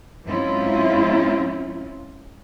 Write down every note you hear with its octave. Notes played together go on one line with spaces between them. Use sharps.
G#2 F#3 C4 C#4 E4 F4